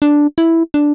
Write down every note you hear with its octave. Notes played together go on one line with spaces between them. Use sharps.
D4
E4
D4